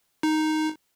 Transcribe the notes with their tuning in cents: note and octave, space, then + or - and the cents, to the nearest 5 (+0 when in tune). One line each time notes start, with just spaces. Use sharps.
D#4 +0